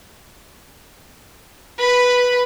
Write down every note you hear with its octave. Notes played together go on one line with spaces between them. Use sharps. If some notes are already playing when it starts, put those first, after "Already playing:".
B4 B5